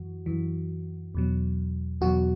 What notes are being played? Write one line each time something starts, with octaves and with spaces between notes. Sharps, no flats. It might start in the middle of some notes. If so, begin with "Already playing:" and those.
Already playing: F#2 E3 F#4
F#2 E3
E2 B2 F#3
E2 B2 F#3 F#4